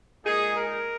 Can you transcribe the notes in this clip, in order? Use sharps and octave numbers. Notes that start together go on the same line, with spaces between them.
A#2 G#3 D#4 G#4
A#4